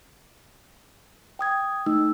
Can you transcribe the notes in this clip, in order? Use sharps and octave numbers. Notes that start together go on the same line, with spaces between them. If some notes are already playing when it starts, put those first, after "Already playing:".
G5 D#6 G#6
A3 D#4 E6